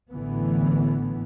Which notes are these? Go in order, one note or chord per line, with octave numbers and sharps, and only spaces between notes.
A1 D3 E3 B3